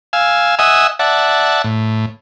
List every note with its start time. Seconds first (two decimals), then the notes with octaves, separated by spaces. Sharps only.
0.13 F5 G#5 E6
0.59 D#5 E5 F#5 G#5 D#6 E6
0.99 D5 E5 F#5 A5
1.64 A2